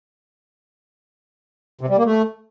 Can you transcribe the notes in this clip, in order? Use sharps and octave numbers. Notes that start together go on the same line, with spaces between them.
C3
G3
A#3
A3